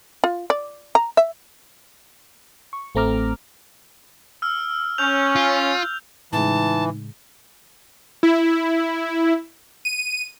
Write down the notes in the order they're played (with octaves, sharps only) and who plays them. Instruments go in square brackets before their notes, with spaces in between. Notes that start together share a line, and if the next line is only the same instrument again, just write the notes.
[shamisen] F4
D5
A#5
E5
[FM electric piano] C#6
A1 A3 C4 A#5 D6 F6
[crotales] E6 F6
[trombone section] C#4 [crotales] F6 G6 F7
[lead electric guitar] F4
[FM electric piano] A2 C#3 G#3 [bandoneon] E3 [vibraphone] D#4 [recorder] A5
[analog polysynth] E4
D#7